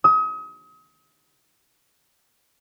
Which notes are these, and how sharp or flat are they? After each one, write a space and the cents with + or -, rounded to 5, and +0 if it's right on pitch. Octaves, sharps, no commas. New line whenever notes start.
D#6 +35